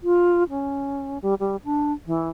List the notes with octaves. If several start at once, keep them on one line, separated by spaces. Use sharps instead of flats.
F4
C#4
G3
G3
D4
E3